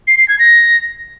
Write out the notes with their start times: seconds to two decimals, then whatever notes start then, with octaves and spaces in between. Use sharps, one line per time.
0.07 C7
0.18 C7
0.28 G#6
0.39 A#6